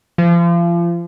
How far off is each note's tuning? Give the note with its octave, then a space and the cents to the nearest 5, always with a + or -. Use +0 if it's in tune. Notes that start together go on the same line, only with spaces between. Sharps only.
F3 -35